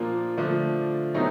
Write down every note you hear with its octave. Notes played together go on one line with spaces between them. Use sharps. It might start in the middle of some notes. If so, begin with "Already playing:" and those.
Already playing: A#2 F3 A#3 D4 F4
D3 F3 A3 D4
B2 F#3 A3 C4 D#4